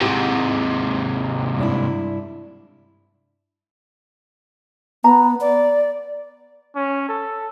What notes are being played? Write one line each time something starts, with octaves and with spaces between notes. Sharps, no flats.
G#2 C3 G#3 E4 G4
G2 D4 E4
B3 A#5
D5
C#4
A4